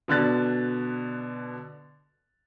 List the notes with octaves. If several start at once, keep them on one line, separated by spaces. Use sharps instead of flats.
B2 D3 F#6 A6